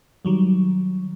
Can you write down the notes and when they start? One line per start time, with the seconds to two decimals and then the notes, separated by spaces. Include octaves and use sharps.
0.25 D#3 F#3 G3